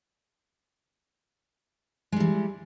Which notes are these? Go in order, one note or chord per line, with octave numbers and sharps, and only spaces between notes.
E3 G3 G#3